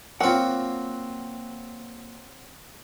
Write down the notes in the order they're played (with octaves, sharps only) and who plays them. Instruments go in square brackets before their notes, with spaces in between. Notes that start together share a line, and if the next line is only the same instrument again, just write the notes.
[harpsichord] F#3 C4 [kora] A#3 F4 [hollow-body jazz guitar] F#5